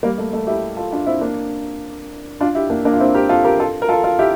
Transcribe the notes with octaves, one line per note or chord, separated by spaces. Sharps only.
G3 A#3
A3
A3
E4 G4
F4 A4
D4 F4
C4 E4
A#3 D4
D4 F4
E4 G4
A#3 D4
A#3 D4
F4
C4 E4
G4 A#4
F4 A4
G4 A#4
F4 A4
A#4
F4 A4
F4 A4
E4 G4